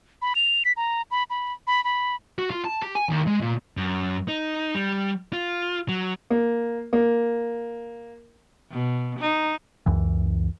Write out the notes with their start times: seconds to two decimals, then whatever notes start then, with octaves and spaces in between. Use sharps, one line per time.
0.22 B5
0.35 F7
0.65 B6
0.77 A#5
1.11 B5
1.30 B5
1.67 B5
1.84 B5
2.39 F#4
2.50 F4
2.64 A5
2.82 G4
2.96 G#5
3.10 D#2
3.28 G#3
3.41 A#2
3.77 F#2
4.28 D#4
4.75 G3
5.33 F4
5.89 F#3
6.30 A#3
6.93 A#3
8.71 B2
9.19 D#4
9.86 C#2 F#2 E3